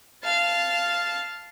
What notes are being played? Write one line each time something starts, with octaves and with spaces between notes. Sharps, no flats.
F5 A5